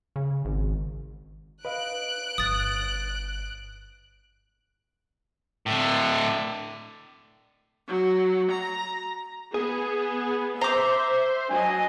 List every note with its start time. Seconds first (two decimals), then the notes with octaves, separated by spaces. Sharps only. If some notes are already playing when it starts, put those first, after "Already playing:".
0.16 C#3
0.45 G#1
1.65 B4 D#5 F5 F#6 D7
2.38 G1 D#6 A6
5.66 A2 D3
7.88 F#3
8.51 A#5
9.54 B3 G#4
10.61 C5 E5 A#5 D6
11.50 F#3 D4 D#5 G#5